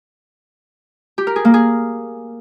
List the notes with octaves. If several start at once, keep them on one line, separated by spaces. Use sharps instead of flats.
G4
A#4
G#4
A#3
G#4